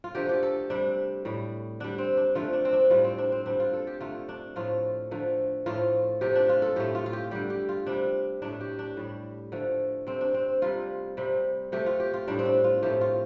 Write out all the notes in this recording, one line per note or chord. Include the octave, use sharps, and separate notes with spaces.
F4
D3 F3 A3 G4
G4
A4
C3 G3 D4
A2 G3
D3 G3 D4
C4
D4
D3 F3 A3 F4
D4
C4
D4
A2 G3 F4
C4
D4
C4
D3 G3 D4
F4
A4
G4
D3 A3 F4
D4
A2 F3 A3 F4
D3 F3 A3
A2 F3 A3 F4
C3 F3 A3 G4
D4
F4
A4
A2 A3 G4
F4
F4
G4
D3 G3 G4
G4
F4
C3 G3 D4
A2 A3 D4
G4
D4
A2 G3
D3 F3 A3
C3 A3 C4
D4
C4
C3 G3 F4
C3 G3
C3 A3 G4
F4
G4
F4
A2 G3 D4
C4
D4
F4
A2 F3 A3 G4
F4